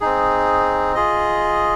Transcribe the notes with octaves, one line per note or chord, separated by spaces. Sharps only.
C4 D#4 G#4
F4 G#4 D#5